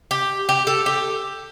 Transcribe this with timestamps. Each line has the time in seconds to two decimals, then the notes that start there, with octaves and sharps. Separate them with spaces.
0.11 G4
0.49 G4
0.67 A4
0.86 G4